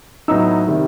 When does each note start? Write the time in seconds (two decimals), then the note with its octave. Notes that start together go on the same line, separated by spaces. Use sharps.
0.28 A2 F#3 B3 D#4 E6
0.67 C3 D#3 G3